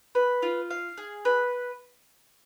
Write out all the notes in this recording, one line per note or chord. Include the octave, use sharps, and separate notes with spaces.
B4
F4
F5
G#4
B4